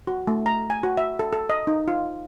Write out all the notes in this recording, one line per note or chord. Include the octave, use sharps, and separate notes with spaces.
F#4
A3
A#5
G#5
F#4
E5
A4
A4
D#5
D#4
F4